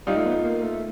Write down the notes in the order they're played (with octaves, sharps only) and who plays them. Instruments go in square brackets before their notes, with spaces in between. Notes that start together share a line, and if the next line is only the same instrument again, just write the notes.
[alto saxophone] G3 [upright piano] D#4 F4
[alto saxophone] A3
B3
A#3
A3